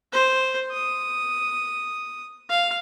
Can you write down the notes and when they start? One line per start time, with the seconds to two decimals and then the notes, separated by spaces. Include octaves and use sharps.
0.13 C5
0.71 D#6
2.49 F5